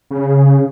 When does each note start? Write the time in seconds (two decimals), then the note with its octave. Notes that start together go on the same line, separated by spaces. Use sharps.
0.11 C#3